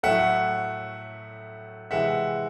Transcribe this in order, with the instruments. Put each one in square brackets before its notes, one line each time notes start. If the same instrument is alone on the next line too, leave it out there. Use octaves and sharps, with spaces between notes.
[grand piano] A2 F#3 A3 E5 F#5
C3 E3 G#3 E5 F#5